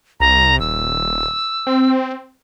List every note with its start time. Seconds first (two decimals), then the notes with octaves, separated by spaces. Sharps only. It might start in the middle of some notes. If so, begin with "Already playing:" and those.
0.20 C2 A#5
0.60 D#1 E6
1.67 C4